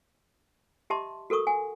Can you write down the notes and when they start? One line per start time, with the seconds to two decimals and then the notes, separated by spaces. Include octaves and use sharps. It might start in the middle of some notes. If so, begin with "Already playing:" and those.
0.90 G4 D#5 E5 A5 C6 D6
1.30 F#4 A4 A#4 C#6 D#6
1.47 F#5 G#5